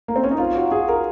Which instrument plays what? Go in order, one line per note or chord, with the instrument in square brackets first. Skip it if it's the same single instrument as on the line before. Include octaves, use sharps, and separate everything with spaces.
[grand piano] A#3
C4
C#4
D#4
F4
F#4
G#4
A#4